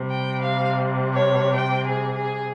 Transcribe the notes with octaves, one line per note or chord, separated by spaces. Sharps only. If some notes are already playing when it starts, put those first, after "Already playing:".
Already playing: C3 G3
G5
F5
C#5
G5
G#4
G#4